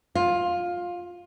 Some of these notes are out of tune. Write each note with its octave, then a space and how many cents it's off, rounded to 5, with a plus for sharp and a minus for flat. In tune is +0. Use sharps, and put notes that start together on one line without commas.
F4 +15